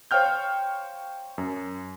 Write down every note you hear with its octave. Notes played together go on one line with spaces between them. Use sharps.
C5 C#5 F5 G5 F6 G6
F#2